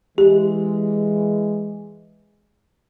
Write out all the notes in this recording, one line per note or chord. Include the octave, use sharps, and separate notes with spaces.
E3 G#3 G4